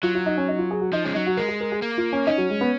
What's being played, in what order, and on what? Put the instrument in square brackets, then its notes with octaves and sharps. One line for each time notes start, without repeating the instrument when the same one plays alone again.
[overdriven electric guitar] F#3 [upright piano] F4
[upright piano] F4
D#4
C#4
D#4
F4
G#4
F#4
[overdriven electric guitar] F3 [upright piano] D#4
[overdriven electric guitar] G#3 [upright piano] C#4
[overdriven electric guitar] F#3 [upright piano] D#4
[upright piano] F#4
[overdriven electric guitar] G#3 [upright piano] A#4
[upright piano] G#4
A#4
G#4
[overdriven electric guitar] A#3
[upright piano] F4
C#4
[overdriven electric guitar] C#4 [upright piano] D#4
[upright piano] F#3
G#3
B3